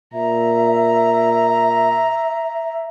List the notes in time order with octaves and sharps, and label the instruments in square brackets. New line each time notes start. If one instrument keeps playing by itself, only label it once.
[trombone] A#2 [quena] E5 [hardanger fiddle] A#5